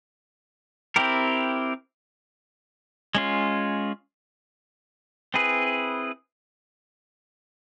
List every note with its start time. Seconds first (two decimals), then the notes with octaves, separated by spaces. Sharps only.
0.96 C4 E4 G4 A#4
3.15 G#3 C#4 F4
5.34 C4 E4 G#4 B4